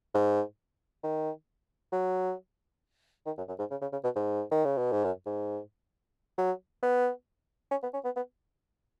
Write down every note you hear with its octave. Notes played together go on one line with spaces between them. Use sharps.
G#2
D#3
F#3
D#3
F#2
F#2
G#2
C#3
C#3
C#3
B2
G#2
D#3
C#3
B2
G#2
F#2
G#2
F#3
B3
C#4
B3
C#4
B3
B3